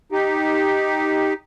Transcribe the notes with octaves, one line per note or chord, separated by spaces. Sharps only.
D#4 G4